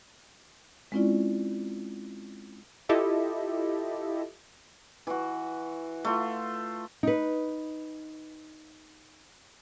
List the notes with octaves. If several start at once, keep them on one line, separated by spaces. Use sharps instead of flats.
G#3 C4 C#4 E4 F4 D5
E4 F4 G4 A4 D#5 E5
E3 F#4
A3 F4
D#4 B4